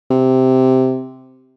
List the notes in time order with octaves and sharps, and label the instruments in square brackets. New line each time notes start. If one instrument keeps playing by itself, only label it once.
[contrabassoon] C3